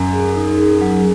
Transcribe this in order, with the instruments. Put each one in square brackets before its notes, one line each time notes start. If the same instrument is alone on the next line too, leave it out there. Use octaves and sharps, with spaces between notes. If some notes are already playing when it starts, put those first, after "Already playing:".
Already playing: [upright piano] F#2
[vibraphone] G#4
D#4
G#4
F#3